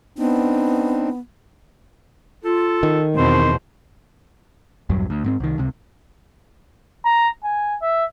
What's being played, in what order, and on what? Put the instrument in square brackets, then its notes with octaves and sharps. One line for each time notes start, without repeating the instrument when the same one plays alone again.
[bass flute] B3 [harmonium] C4 D4 D#4
[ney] F4 [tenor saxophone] A4
[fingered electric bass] D#3
[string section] E2 B2 [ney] C4 [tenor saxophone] C5
[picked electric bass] A#1 E2 G2 F#3
D2
G#2 A#3 C4
C2 D#3
C#2 C3
[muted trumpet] A#5
G#5
E5